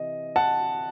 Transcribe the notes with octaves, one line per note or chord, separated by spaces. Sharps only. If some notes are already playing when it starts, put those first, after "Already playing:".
Already playing: C3 E3 D#5
F#5 A5